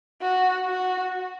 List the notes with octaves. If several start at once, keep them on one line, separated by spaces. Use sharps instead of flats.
F#4
F#4